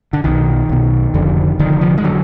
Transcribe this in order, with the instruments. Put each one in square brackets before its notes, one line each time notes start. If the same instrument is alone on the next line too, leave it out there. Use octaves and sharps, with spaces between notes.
[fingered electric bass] D3
B1 B2 D#3
B1 B2
F1 F2 D3
F1 F2 D3 D#3
F3
G#3
D3 F#3